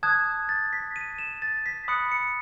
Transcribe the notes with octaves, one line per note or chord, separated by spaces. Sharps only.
A5 D#6 F#6 G#6
A6
B6
D#7
E7
A6
B6
B5 D#6 F#6 C#7
C#7